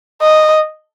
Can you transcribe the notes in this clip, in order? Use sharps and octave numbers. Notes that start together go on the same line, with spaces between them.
D#5